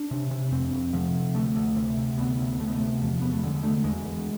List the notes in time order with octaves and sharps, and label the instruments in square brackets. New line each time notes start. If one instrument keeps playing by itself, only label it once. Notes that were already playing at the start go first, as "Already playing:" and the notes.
Already playing: [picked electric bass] D4
C3
C3
F2 C4
F2
C3 F3
C3
D2 A3
D2
C3
C3
D2 B3
D2
C3 A3
B3
A3
C3
E2 F3
E2 B3
A3
D3 G#3
D3 A3
E2 G#3
E2